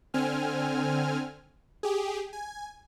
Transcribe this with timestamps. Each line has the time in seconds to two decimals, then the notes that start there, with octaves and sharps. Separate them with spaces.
0.14 D3 C4 G#5 F6
1.83 G4 G#4
2.33 G#5